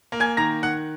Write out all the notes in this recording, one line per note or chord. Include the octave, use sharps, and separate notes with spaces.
A#3
G#5 G#6
D#3 A#5 A#6
D#3 F#5 F#6